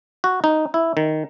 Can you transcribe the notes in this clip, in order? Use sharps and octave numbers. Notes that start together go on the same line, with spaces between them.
F#4
D#4
E4
D#3